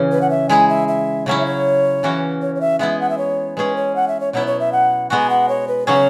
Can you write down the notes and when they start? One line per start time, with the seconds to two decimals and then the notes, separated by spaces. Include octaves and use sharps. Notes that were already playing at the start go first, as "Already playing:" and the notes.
Already playing: C#3 E3 C#4 G#4
0.12 B4
0.21 F#5
0.30 E5
0.49 G#3 E4 G#4 G#5
0.69 E5
0.88 E5
1.26 C#3 F#3 C#4 E4 C#5
1.40 E5
1.45 C#5
2.03 C#3 E3 C#4 F#4
2.42 C#5
2.55 C#5
2.61 E5
2.79 G#3 B3 E4 G#4 E5
3.00 F#5
3.10 E5
3.18 C#5
3.57 G#3 C#4 G#4 B4
3.76 C#5
3.96 F#5
4.08 E5
4.20 C#5
4.33 B2 F#3 B3 E4 C#5
4.47 C#5
4.60 E5
4.72 F#5
5.10 G#3 B3 F#4 G#5
5.30 F#5
5.49 C#5
5.68 B4
5.87 C#3 F#3 C#4 G#4 C#5